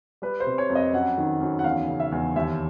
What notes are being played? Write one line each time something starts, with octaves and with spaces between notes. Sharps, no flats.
G3 B4
C5
C3
C#5
F2
D#5
F#2 F#5
D#3
F#2
F#5
E2 F5
C#3
E5
E2
D#2 E5